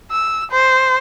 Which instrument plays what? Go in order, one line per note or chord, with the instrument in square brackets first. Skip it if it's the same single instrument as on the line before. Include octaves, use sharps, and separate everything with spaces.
[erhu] E6
C5